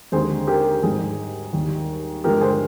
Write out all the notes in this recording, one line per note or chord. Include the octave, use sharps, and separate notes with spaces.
D#2 D3 G#3 C4 G#4 C5
G4 A#4
G#1 G#2 G3 G#4
D#2 D#3 G3
G2 D3 F3 G#3 G4 A#4
G#4 C5